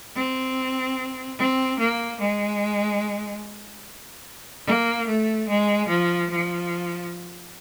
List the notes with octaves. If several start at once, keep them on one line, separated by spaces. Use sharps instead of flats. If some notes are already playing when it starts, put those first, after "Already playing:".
C4
C4
A#3
G#3
A#3
A3
G#3
F3
F3